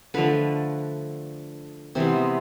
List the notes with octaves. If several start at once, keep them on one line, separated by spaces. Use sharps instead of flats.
D3 F3 A3 B4
C3 E3 G#3 B3 C5